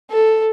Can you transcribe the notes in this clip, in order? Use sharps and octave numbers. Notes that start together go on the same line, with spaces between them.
A4